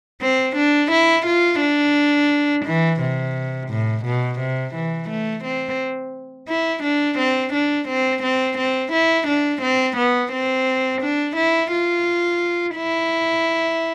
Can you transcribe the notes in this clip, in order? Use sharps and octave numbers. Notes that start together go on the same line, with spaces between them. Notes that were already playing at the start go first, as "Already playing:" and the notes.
C4
D4
E4
F4
D4
E3
C3
A2
B2
C3
E3
A3
C4
E4
D4
C4
D4
C4
C4
C4
E4
D4
C4
B3
C4
D4
E4
F4
E4